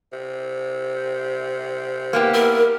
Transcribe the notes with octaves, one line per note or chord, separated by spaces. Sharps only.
C3
A#3 B3 G4
E4 A#4